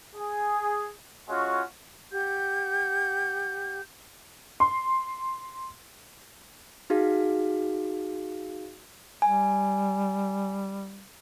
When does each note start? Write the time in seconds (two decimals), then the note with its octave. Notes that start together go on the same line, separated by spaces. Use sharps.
0.15 G#4
1.29 G#3 C#4 F4 F#4
2.12 G4 F#5 G6
4.60 C6
6.90 D#4 F#4 G#4 F5
9.22 G3 G#5